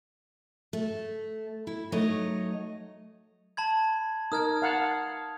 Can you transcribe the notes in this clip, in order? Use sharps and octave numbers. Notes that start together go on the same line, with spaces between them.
A3
E4
F#3 A3 D#4 C#5 D#5
A5 B5 G#6
D#4 A#4 D#6 F6 G#6
F5 F#5 A5